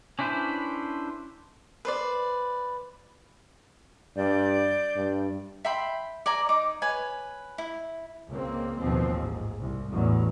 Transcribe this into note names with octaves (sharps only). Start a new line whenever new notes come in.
C#4 D4 E4 B4 C5
B4 C5 D5
G2 D5 G6
G2
E5 G5 B5 C6
D5 G#5 A#5
D#4 D6
B4 C#5 G#5
E4
C#2 A#3 C4
A1 D#2 B2 F3 C4
G#2
C2
A1 E2 A2 F#3